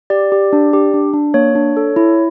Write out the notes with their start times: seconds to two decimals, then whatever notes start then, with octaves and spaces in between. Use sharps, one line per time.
0.10 G4 D5
0.32 G4
0.53 D4
0.73 G4
0.94 D4
1.13 D4
1.34 A#3 C#5
1.55 D4
1.77 A4
1.96 E4